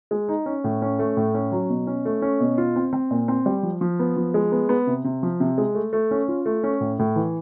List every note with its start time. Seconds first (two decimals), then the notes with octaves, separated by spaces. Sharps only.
0.11 G#3
0.29 D#4
0.46 C#4
0.64 A2
0.82 C#4
0.99 A3
1.17 A2
1.34 C#4
1.52 F#3
1.69 B2
1.87 C#4
2.05 A3
2.22 C#4
2.40 B2
2.58 F4
2.76 C4
2.93 C4
3.11 A#2
3.28 C4
3.46 G3
3.63 F3
3.81 F3
3.99 B3
4.17 F3
4.34 G#3
4.52 B3
4.69 B3
4.87 C3
5.04 C3
5.23 F3
5.40 C3
5.58 G#3
5.75 A3
5.93 A3
6.11 C#4
6.28 F4
6.46 A3
6.63 C#4
6.81 A2
6.99 A2
7.16 E3